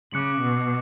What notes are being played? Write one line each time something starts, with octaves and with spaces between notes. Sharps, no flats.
C#3 D6 F#6 C#7 F#7
B2